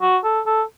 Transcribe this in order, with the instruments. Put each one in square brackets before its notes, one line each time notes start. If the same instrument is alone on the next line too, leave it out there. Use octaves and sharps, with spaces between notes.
[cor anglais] F#4
A4
A4